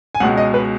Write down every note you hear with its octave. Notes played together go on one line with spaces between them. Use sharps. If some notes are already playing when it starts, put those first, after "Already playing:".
G#5
C#2 B2 G#3 F#5
D#5
B4